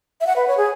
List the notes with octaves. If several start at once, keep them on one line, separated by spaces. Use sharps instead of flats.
E5
F#5
B4
C#5
G#4